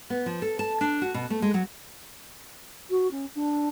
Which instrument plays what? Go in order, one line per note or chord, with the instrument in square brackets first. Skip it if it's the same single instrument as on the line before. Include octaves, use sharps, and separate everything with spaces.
[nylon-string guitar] B3
F3
A4
A5
D4
F#4
B2
A3
G#3
F#3
[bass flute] F#4
C#4
D4